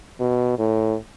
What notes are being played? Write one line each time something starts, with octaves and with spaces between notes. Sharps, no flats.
B2
A2